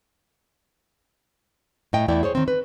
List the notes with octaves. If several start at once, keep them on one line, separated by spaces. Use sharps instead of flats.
A2 A3 D#5 G5
E2 A3 E4 D5 G5
G#4 C5 C#5
D#3 C4
B4